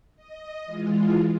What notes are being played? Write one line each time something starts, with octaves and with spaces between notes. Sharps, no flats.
D#5
E3 G#3 F4